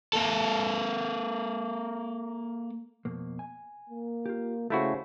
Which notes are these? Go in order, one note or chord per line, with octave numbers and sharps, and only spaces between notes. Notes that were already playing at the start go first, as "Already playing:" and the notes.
A#3 A4
F2 B2 A#3
G#5
A#3
F4 G4
C#3 A3 E4 F#4 G4 C5